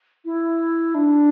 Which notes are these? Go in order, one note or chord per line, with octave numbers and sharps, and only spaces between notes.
E4
D4